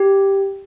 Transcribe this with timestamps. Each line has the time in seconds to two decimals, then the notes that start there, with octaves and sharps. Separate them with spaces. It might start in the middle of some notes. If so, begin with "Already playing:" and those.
Already playing: G4